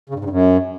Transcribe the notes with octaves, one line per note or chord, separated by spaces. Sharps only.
C#3
G2
G#2
G2
F#2